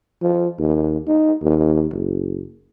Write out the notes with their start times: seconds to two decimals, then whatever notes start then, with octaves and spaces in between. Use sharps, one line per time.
0.22 F3
0.59 D#2
1.07 D#4
1.41 D#2
1.92 F#1